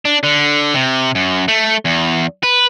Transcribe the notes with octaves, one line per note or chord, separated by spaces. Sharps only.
D4
D3
C3
F#2
A3
E2
B4